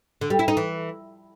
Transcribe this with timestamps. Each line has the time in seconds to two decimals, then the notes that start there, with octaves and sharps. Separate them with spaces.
0.21 D3
0.30 G3
0.39 E4
0.48 D#4
0.57 E3